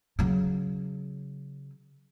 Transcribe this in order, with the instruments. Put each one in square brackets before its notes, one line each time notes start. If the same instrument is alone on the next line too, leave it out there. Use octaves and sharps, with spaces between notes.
[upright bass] C#3 F#3